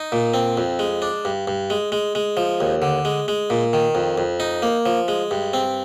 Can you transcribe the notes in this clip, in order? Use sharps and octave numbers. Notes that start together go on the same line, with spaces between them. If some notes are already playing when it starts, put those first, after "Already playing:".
Already playing: D#4
A#2
C4
F2
G#3
D4
G2
G2
G#3
G#3
G#3
F3
D#2
D3
G#3
G#3
A#2
D#3
F2
F2
D#4
A#3
F3
G#3
G2
C4